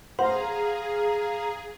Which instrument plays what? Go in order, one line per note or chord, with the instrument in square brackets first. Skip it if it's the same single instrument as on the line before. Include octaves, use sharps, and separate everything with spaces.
[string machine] G#4 [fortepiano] C5 [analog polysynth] F5 A#5 [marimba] F#5